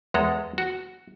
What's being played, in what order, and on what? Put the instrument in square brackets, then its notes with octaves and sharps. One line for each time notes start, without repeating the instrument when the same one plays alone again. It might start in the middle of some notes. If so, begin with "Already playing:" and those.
[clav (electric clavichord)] E2 G#3 A4 A#5
F#4